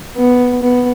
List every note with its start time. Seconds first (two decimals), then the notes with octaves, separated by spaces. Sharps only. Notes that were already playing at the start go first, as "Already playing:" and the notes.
0.16 B3
0.63 B3